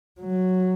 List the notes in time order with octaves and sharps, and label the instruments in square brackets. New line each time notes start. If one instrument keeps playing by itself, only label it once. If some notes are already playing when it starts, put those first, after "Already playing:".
[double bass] F#3